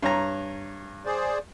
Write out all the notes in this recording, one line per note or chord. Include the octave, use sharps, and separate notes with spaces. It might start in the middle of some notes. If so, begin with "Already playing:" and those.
G2 C#5 A#5
G#4 C5 D5